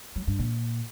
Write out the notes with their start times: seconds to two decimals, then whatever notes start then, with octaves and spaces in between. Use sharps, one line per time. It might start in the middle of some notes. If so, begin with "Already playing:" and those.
0.16 F#3
0.27 G2
0.39 A#2